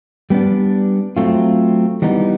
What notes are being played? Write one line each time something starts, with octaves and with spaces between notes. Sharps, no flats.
G3 B3 D4
F#3 A3 C4 F4
E3 G3 B3 D#4